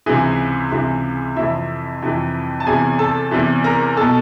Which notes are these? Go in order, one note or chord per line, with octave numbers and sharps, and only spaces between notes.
C#2 C3 E3 G#4 G#5
C#2 C3 E3
F2 C3 E3 E4 E5
F2 C3 E3
A5
E2 C3 E3 G#4 G#5
A4 A5
E2 C3 E3
A#4 A#5
B2 A4 A5